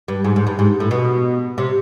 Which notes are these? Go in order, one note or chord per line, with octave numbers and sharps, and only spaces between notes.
G2
G#2
G#2
G2
G#2
A2
B2
C3